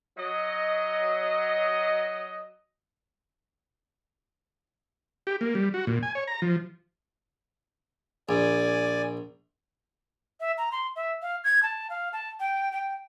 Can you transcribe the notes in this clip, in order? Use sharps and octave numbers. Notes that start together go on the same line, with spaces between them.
F#3 D#5
G4
A#3
G3
F#4
A#2
G#5
C#5
A#5
F3
A#1 D5 G#5
E5
A#5
C6
E5
F5
G#6
A5
F5
A5
G5
G5